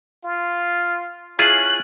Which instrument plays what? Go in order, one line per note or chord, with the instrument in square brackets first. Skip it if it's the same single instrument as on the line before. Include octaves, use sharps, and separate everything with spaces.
[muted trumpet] F4
[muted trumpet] C#4 [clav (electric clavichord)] E4 F4 G#4 [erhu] F#6